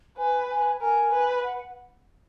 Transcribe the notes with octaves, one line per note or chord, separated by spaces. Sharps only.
B4 G#5
G#5
A#4 G#5
B4
F#5